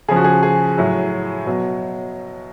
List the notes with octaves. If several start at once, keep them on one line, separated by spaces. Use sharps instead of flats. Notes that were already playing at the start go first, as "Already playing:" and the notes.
C#3 F3 G#4
F#4
G#4
G#4
A2 F#3
B2 F#3